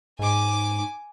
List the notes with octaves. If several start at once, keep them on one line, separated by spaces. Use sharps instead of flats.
G#2 G#5 D6